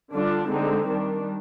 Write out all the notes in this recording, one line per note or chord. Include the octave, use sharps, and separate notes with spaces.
D3 G3 D4 F4
D3 G#3 C4 D#4
D#3 G3 D4